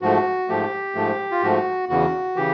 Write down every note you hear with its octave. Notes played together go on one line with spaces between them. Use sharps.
G#2 F3 A3 F#4
G#2 F3 A3 G4
G#2 F3 A3
F4
G#2 F3 A3 F#4
E2 C#3 E3 F#4
C#3 E3 G4